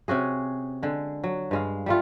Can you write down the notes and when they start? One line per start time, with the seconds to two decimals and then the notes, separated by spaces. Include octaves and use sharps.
0.08 C3 C#4 F#4 G#4
0.83 D3 G#3
1.24 F#3
1.51 G2 G#3 F5
1.86 G3 A3 F4